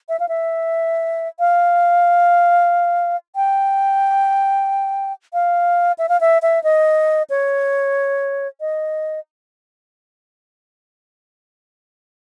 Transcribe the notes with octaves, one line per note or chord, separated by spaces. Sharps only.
E5
F5
E5
F5
G5
F5
E5
F5
E5
E5
D#5
C#5
D#5